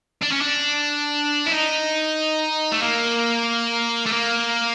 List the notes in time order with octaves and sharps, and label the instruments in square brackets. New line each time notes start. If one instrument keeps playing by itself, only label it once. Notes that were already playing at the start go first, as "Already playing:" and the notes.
[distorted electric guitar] D4
C#4
D4
E4
D#4
A3
A#3
A3
A#3